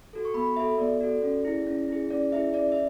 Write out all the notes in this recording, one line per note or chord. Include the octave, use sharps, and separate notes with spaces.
F#4 A4
C#6
B3 B5
F#4 A4 E5
B3 D5
F#4 A4
C#4
E4 G#4
C#4
E4 G#4
C#4 D5
E4 G#4 E5
C#4 D5
E5